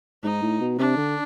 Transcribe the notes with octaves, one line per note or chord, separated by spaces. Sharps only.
G#2 D#4
A2
B2
C3 D4
D3